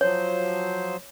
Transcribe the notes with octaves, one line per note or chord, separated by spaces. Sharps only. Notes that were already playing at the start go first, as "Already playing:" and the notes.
F3 F#3 C5 C#5